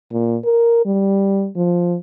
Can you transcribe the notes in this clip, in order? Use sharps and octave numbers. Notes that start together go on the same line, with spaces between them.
A#2
A#4
G3
F3